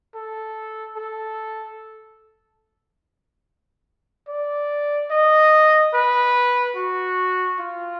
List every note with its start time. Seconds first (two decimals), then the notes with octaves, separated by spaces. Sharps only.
0.15 A4
0.96 A4
4.28 D5
5.10 D#5
5.93 B4
6.76 F#4
7.59 F4